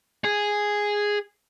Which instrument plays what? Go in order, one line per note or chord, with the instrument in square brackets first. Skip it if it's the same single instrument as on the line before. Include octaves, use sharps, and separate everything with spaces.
[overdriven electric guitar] G#4